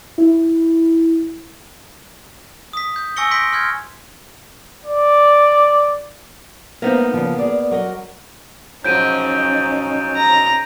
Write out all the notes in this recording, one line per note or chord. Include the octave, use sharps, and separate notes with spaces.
E4
D#6 B6
G6
G#5 C#6 E6 A#6 C#7 G7
C6 G6 A#6 B6 D7
C6 F6 G6 G#6
D5
A#3 B3 D#4 C5 E5
C#3 F3
G#4 D5
F#3 A#4 D#5
G#2 F3 F#3 C#4 D#4 G6 D7 D#7
A#5